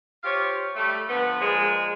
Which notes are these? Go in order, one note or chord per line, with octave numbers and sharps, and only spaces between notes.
F4 G4 C5 C#5 F5
G3 A3
D3 F3 B3
A#2 F3 G#3